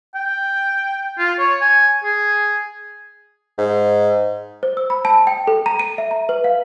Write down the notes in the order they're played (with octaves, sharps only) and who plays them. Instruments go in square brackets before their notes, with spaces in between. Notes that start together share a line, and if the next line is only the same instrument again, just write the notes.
[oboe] G5
F4
C#5
G#5
G#4
[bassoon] G#2
[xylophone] C5
E6
B5
A5
G5
A4
A#5
D#7
E5
A#5
B4
F5